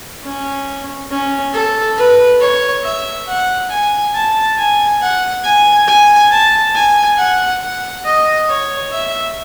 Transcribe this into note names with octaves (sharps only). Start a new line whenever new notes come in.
C#4
C#4
A4
B4
C#5
E5
F#5
G#5
A5
G#5
F#5
G#5
G#5
A5
G#5
F#5
F#5
D#5
C#5
E5